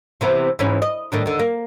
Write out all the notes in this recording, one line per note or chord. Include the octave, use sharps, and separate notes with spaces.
C3 E3 B3
G#2 E3 C#4
D#5
A2 D#3 D4
D#2 D3
A#3